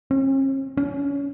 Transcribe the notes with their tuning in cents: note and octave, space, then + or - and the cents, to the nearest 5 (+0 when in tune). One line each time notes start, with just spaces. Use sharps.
C#4 -45
C#4 +25